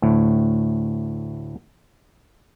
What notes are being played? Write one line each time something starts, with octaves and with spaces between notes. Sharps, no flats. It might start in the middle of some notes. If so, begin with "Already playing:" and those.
D2 A2